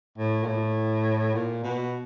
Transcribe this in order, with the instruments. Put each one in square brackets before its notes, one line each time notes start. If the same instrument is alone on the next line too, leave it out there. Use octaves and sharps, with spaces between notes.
[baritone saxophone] A2
A#2
A2
A#2
B2